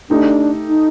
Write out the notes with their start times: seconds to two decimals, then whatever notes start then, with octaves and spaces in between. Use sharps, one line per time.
0.10 A3 D4 D#4 G4
0.68 D#4